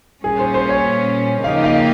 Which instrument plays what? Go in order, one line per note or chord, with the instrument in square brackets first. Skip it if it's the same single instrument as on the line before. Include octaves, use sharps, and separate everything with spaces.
[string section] A#2 G3 C#4 [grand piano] G#4
[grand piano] C5
C5
C#5
[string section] C#3 F3 A#3 D#4 G4 [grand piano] F5
[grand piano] F5